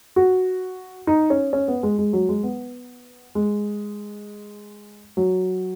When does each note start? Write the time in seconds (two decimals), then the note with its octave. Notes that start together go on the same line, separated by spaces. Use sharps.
0.16 F#4
1.07 D#4
1.30 C#4
1.53 C#4
1.68 B3
1.83 G#3
1.99 G#3
2.13 F#3
2.29 G#3
2.43 B3
3.35 G#3
5.17 F#3